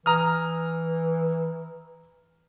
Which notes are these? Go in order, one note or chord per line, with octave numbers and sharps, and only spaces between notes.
E3 A#5 D#6 F6